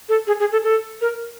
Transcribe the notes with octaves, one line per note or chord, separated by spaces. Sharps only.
A4
G#4
G#4
A4
A4
A#4